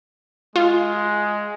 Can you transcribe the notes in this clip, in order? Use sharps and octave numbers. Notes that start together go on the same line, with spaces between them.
G#3 F4